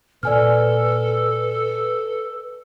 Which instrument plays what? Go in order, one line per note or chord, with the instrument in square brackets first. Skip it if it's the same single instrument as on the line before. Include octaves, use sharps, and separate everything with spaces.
[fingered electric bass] A#2 A#3 [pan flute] A4 [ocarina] B4 [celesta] D5 G#5 F6